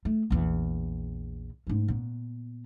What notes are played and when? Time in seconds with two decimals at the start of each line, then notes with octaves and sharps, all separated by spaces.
0.05 A3
0.30 A#1 E2
1.67 G#2 A3
1.88 A#2 B3